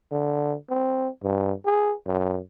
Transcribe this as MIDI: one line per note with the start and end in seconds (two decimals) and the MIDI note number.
0.12 0.55 50
0.69 1.08 60
1.23 1.52 43
1.66 1.94 68
2.06 2.39 42